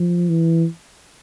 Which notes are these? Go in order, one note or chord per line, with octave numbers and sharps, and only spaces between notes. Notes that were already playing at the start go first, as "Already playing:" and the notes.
Already playing: F3
E3